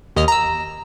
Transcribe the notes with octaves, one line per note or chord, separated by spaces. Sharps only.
D#2 D#5 F6
A#5 E6